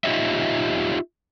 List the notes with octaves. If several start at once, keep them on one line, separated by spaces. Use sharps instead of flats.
D#4 F4 G4 C#5 D#5 E5